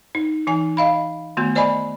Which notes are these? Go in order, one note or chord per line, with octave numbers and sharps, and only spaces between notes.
D#4
E3 D#4 G#5
D#5 F5 B5
D#3 A3 B3 F#4
C5 D5 D#5 G#5 B5